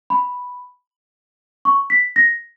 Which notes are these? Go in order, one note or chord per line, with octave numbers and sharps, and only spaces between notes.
B5
C#6
B6
A#6